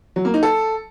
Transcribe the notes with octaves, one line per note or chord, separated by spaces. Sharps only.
F#3
A#3
D#4
A4